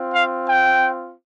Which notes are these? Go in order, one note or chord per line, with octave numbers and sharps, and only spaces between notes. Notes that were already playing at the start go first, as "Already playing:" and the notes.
Already playing: C4 F4
F5
G5